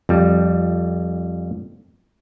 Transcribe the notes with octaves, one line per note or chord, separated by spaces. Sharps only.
F2 G3